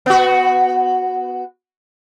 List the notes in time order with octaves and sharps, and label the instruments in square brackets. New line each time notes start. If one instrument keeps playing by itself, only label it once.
[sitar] B3 F#4